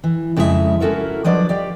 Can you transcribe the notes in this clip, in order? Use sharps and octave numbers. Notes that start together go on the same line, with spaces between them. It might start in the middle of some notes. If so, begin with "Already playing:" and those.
E3
F2 C#3 G#3 E4 G#4 E5
C#4 E4 F#4 A4 A#4
F3 F#3 D4 B4 D5 D#5
G4 D5 F5